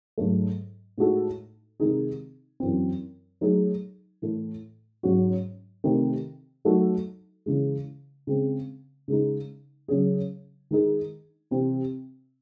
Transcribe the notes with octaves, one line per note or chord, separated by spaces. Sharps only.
G#2 F#3 A3
A2 G#3 D#4 F#4 A4
C3 D#3 G#3 D#4 G#4
F#2 E3 C4
F#3 A3 D#4 G#4
A2 E3 A3
G#2 F#3 C#4 F#4
C3 D#3 A3 C4
F#3 A3 D#4 F#4 A4
C#3 E3 G#3
C#3 G#3 C4
C#3 G#3 D#4
C#3 F#3 C#4 G#4
D#3 G#3 D#4 G#4
C3 E3 C4